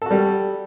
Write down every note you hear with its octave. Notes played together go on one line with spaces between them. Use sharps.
G3 F#4 A4